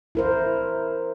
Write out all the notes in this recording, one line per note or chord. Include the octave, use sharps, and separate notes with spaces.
E4 A#4 C5